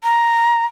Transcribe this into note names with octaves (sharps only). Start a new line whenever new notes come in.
A#5